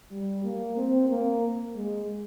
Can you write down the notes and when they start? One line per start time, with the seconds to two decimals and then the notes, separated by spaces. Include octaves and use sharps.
0.12 G3
0.44 A#3
0.78 C4
1.10 A#3
1.76 G#3